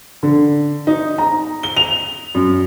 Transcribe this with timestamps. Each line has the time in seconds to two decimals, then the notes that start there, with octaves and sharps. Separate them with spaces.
0.23 D3
0.87 D#4
1.18 A#5
1.63 G7
1.77 F7
2.34 F#2